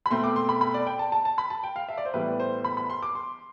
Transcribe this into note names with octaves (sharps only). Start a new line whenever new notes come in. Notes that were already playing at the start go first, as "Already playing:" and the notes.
B5
B2 A3 C4 C6
D6
C6
B5
B5
D5
G5
A5
A5
A5
B5
A5
G5
F5
E5
D5
C5
A2 E3 G3 B3 B4
C5
B5
B5
C6
D6
C6